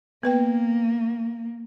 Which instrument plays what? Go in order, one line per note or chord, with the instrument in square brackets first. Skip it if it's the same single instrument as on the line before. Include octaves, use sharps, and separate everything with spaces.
[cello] A#3 [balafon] B3 B4 G5